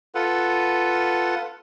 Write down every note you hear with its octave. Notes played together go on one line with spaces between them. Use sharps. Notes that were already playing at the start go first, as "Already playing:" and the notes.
F4 A4 B4 F#5